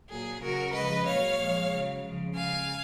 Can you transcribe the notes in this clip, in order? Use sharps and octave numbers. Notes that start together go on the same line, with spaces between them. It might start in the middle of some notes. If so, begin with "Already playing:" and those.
A#2 F#3 G#4
C#3 F#3 F#4 A#4
C#3 F3 G#3 B4 D#5
A#2 F#3 C#5 F5
A#2 F3 G#3
C#3 F#3
C#3 F3 G#3
C#3 G#3 F5 G#5